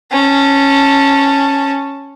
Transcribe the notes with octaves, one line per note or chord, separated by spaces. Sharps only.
C#4 A5